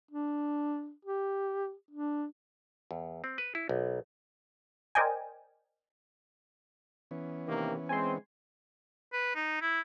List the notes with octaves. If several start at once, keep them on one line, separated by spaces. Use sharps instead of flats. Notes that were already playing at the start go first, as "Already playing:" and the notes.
D4
G4
D4
E2
C4
B4
E4
B1
A#4 C5 D5 D#5 G5 G#5
E3 B3 C#4
C3 D#3 A#3
G#3 C4 G#5 C6
B4
D#4
E4